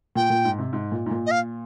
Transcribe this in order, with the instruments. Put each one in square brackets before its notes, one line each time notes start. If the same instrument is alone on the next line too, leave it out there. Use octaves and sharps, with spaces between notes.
[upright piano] A#2 [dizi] G5
[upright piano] A#2
G#2
C3
G#2
A#2
G#2
A#2
[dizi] D#5
F5